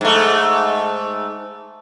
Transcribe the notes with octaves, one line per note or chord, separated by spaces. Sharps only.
G#2 A3